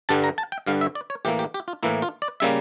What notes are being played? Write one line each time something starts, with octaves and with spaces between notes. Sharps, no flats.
G2 D3 G3 A5
A#5
A5
G5
G2 D3 G3 F5
E5
D5
C#5
A2 E3 A#3 G4
G4
G4
F4
A2 E3 A#3 E4
F4
D5
C#3 G3 A#3 E5